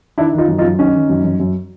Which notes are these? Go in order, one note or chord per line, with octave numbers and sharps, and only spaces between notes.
D#3 D4 E4
D#3
D#4 F4
F#2
D#4 F4
F#2
D#3 C#4 D#4
D#3
F#2
F#2
F#2